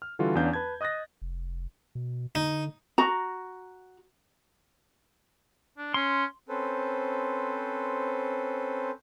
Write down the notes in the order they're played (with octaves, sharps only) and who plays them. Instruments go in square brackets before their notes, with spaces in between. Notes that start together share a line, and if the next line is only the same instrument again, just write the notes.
[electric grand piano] F6
D3 E3 G3 F4 F#4 A4
E2 B3 C#4 D4 F5 G6
B4 A5 G#6
D#5 D#6 F#6 A6 A#6
[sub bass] F1
B2
[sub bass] D3 [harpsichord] D#4
[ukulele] F#4 A#5
[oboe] D4
[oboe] C#4 [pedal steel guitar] C6
[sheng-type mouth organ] C4 C#4 A4 B4 C5